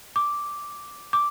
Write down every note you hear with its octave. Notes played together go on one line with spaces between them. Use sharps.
D6
D6